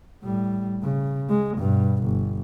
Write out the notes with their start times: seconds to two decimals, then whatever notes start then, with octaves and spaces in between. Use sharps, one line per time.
0.22 A2 G3
0.83 C#3
1.29 G#3
1.58 G2 B2
2.04 G1